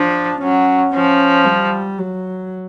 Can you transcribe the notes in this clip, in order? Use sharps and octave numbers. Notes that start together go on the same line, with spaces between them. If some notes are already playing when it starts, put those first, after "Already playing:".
Already playing: F3 D4
F#3 C#4
F3 C#4
G3
F#3